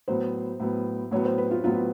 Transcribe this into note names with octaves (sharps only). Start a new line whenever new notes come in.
A2 F#3 B3 C5
A2 F#3 B3
A2 F#3 B3 C#5
C5
B4
F4
A2 F#3 B3 F4